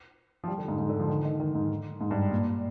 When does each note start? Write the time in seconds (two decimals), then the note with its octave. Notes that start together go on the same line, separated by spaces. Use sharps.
0.44 F3
0.48 G3
0.58 D3
0.68 G#2
0.78 G#2
0.89 D3
0.99 F3
1.09 D#3
1.25 D#3
1.40 D#3
1.55 G#2
2.01 G#2
2.11 G2
2.31 A#2